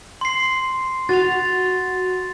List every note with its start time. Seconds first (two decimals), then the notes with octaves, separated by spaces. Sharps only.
0.21 C6 C7
1.09 F#4 A6 F7